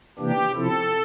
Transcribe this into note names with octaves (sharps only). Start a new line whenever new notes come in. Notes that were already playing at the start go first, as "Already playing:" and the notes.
C3 E3 A#3 D4 G4
C3 F3 C4 E4 A4